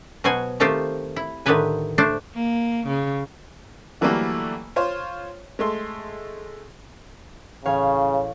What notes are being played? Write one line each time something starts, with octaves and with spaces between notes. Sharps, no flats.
B2 F#3 F#4 C5 G#5
D#3 A3 C4 F4 G4 C5
E4
A2 D3 D#3 G4 B4 G#5
A3 D4 C5
A#3
C#3
D3 E3 F#3 G3 A3 A#3
F4 C5 C#5
G#3 A3 C6
A1 C#3 C#5 F5